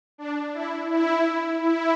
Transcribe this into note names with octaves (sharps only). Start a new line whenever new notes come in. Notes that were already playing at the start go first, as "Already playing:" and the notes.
D4
E4
E4
E4